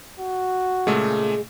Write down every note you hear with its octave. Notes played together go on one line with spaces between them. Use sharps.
F#4
A#2 C#3 G#3 A3